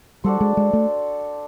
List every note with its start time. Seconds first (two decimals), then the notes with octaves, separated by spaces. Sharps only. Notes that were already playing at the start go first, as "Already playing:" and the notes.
0.24 G3 D4 F#4 A4 C5
0.41 G#3
0.57 G#3
0.73 A3